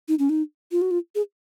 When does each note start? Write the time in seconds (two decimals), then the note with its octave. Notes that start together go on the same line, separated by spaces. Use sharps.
0.08 D#4
0.19 C#4
0.29 D#4
0.72 F4
0.81 F#4
0.91 F4
1.15 G#4